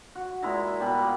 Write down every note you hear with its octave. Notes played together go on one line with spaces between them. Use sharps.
F#4
A#2 G#3 E4 A#5
B2 G3 B3 B5
A#3